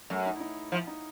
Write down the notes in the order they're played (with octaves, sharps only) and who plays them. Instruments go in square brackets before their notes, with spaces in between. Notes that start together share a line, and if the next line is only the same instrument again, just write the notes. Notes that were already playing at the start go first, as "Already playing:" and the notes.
[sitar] F#2 [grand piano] A3
[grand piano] D#4
E4
D#4
[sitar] F3 [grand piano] E4
[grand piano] D#4